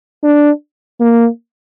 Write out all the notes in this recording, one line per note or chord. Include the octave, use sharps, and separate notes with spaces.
D4
A#3